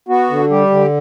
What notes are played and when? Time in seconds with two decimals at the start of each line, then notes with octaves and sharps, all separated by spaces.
0.08 B3 F#4
0.30 D3
0.50 G3 G4
0.70 D3